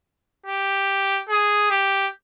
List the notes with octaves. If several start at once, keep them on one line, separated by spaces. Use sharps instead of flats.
G4
G#4
G4